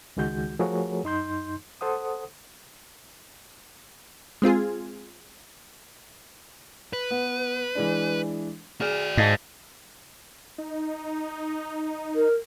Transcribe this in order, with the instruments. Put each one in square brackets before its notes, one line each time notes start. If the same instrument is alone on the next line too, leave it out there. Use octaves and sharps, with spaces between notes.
[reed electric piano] C#2 D#3 G#3 F#4 G6
F3 A3 F#4 G#4 A#4 C#5
F#2 D#4 C6 G6
A4 C5 F#5 D#6
[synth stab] G#3 C4 F4 G#4
[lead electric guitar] B4
[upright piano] B3
E3 G#3 D4
[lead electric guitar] F#4 D5 [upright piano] G#4 F6
[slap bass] G#2 [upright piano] D#5 F5 A5
[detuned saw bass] D#4
[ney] A#4